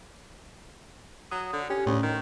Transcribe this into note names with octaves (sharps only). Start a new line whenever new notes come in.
F#3 D#6
D3
C#4 G4
D2 A2 C#4
D#3